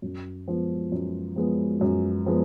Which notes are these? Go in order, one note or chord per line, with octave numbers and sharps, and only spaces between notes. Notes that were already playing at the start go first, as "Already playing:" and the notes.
F#2
F3 G#3 B3
F#2
F3 G#3 B3
F#2
F3 G#3 B3